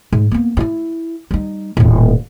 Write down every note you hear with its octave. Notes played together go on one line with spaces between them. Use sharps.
G#2
A#3 B3
G2 E4
G3 D#4
D#1 A2